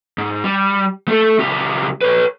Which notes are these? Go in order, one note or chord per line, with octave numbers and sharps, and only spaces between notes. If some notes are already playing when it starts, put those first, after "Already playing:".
G#2
G3
A3 A4
C#2 G4
B4 C#5